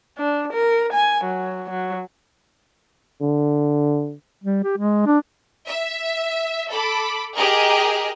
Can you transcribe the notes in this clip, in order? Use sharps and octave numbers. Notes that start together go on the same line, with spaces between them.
D4
A#4
G#5
F#3
F#3
D3
G3
G4
G#3
D4
E5
A4 B5 D6
G4 G#4 A#4 D#5